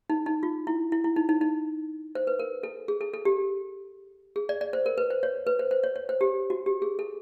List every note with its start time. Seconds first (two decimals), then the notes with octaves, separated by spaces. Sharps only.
0.10 D#4
0.26 D#4
0.43 F4
0.67 E4
0.92 E4
1.04 E4
1.16 D#4
1.29 D#4
1.41 D#4
2.15 C5
2.27 B4
2.39 A#4
2.63 A4
2.88 G#4
3.01 A4
3.14 A4
3.25 G4
4.36 G#4
4.49 D5
4.61 D5
4.73 C5
4.86 A#4
4.98 B4
5.11 C5
5.23 C#5
5.47 B4
5.59 C5
5.71 C5
5.84 C#5
5.96 C#5
6.09 C5
6.21 G4
6.50 F#4
6.66 G4
6.82 G#4
6.99 A4